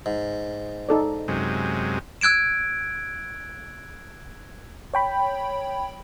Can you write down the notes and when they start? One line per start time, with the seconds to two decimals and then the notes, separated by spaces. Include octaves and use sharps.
0.06 G#2
0.89 D#4 A4 D5
1.28 F#2 C3 G#3
2.21 E6 F#6 G#6 D7 E7
4.94 C#5 G5 B5